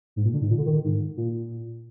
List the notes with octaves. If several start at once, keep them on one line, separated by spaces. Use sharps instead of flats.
G#2
A#2
D3
G#2
A#2
D3
D#3
G#2
A#2